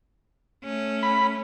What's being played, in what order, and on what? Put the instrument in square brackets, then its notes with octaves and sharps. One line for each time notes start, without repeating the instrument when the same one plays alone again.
[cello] A3 C#4
[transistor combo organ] B5